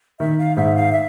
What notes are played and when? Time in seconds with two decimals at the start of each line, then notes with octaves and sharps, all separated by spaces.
0.20 D#3 E5
0.39 F5
0.56 G#2 E5
0.75 F5
0.92 E5